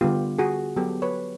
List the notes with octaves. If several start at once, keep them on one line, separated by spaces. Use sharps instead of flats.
D3 G3 B3 F4 G4
F#4 G#4
F#3 B3 G4 A4
B4 C#5